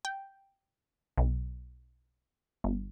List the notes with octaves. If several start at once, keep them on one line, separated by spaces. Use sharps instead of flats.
G5
B1
G1